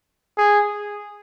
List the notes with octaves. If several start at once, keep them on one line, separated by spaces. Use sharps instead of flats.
G#4